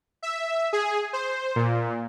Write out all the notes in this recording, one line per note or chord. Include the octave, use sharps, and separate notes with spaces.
E5
G#4
C5
A#2